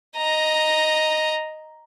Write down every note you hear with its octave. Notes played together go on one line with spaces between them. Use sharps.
D#5 A#5